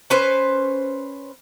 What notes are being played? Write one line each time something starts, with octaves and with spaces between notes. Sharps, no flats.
C#4 B4 C5